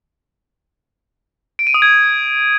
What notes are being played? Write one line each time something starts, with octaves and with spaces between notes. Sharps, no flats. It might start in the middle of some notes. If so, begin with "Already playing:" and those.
D7
D#7
D#6
G#6